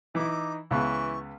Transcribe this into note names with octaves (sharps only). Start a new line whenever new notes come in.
E3 D#4 E4 D6
C#2 C#3 E3 B3 C#6